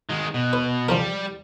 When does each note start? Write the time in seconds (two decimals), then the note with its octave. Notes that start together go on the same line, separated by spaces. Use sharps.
0.09 D#3 G#3
0.34 B2
0.53 B4
0.89 C#3 F3 G3 A#4